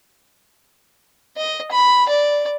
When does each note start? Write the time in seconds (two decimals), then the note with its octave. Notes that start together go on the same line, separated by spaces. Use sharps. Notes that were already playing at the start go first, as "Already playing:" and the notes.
1.37 D#5
1.72 B5
2.09 D5